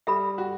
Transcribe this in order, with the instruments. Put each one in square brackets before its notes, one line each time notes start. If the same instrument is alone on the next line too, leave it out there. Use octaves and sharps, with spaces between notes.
[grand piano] G3 [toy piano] A4 E5 B5
[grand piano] F#4